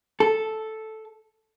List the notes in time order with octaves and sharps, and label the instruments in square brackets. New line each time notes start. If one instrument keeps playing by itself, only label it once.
[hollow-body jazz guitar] A4